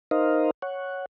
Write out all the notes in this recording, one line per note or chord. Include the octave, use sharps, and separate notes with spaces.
D#4 A#4 C5 D#5 F5
C#5 F#5